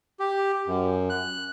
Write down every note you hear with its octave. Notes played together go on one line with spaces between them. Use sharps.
G4
F#2
F#6